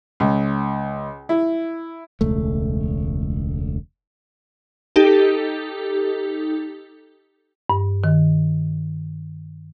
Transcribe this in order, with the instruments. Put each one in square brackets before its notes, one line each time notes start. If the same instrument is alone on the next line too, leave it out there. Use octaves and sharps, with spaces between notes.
[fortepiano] C#2
E4
[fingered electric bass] E1 C#2 A3
[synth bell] D#4 G4 A4
[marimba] G2
D#3